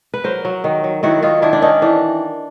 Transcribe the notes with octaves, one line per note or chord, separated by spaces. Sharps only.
B4
F#3 A#4 C5
F#3
D#3
F#3
D#3 E4 F#4
D#3 D#4 F4
D#3 D4 E4
D4
D#3 C#4 D#4
E3 D4